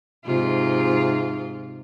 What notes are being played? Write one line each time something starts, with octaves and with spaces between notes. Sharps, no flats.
G#2 C3 F4